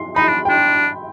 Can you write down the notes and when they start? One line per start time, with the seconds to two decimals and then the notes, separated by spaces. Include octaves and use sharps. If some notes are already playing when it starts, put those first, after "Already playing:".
Already playing: C6
0.16 D#4 B5
0.28 D4
0.45 D4 G5